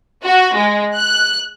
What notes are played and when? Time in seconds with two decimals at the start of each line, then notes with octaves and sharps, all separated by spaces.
0.24 F#4
0.54 G#3
0.96 F#6